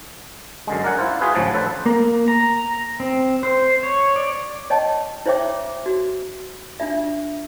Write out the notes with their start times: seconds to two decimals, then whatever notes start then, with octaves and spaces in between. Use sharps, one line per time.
0.67 F#2 D3 G#3
0.84 A#4 D5 F#5 G#5
0.98 E4 F4 C5
1.20 F4 F#4 G#4 B4 F5
1.35 A1 D2 F3 F#3 G#5 A5
1.54 A4 B4 C5 D5
1.86 A#3
2.28 A#5
3.00 C4
3.43 C5
3.83 C#5
4.16 D5
4.70 C#5 D#5 G5 A5
5.26 E4 C5 C#5 E5 G5 D6
5.86 F#4
6.80 D4 F4 E5